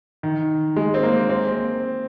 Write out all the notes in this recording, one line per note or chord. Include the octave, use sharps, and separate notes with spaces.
D#3
G#3
C4
A#3
C4